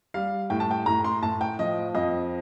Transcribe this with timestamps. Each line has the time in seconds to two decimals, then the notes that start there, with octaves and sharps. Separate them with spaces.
0.14 G3 F5
0.50 A2 G5
0.60 A5
0.71 G5
0.86 A2 A#5
1.04 C6
1.23 A2 A5
1.41 G5
1.59 F3 D#5
1.95 F2 D#5